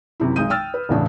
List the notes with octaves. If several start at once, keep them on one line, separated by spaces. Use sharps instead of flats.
F#2 C3 E4
B1 G#3 D#6 G6 D#7
G5 E6 F6 A6
B4
E1 A1 A2 C#3 E3 D4